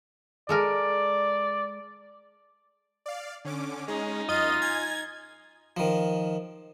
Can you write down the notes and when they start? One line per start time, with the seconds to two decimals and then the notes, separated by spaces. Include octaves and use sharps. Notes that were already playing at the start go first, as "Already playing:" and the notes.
0.49 G#3 A4 A#4 D5
3.06 D5 F5
3.45 D3 C#4 D6
3.88 G#3 C#4 D#4 G#4
4.29 F#2 F4 D#5 D#7
4.62 G#5 G#6
5.77 D#3 F3